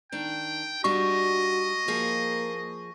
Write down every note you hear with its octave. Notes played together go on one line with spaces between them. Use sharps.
D#3 D4 G5
G3 D4 F4 F#4 D#5 C#6
F3 A#3 G#4